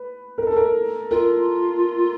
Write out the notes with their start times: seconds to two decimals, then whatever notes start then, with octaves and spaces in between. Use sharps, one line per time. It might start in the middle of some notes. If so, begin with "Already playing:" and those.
Already playing: B4
0.38 A#4
0.47 A4
0.56 A#4
1.11 F4 A#4